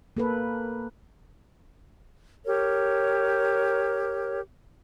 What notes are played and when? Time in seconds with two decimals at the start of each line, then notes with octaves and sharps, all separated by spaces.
0.17 A#3 A4 B4
2.45 G4 A#4 C#5